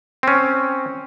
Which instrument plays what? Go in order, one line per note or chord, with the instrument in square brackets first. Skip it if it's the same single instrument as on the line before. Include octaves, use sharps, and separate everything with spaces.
[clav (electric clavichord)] C4 C#4